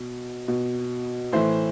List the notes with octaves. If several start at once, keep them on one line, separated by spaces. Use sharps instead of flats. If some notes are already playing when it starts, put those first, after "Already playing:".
Already playing: B2
B2
A2 E3 C5 E5